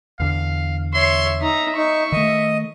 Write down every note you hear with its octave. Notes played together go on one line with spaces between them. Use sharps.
E2 D3 F5
C#5 E5 C6
D#4 E5 A#5
D#4 C#6
D#3 A3 D#5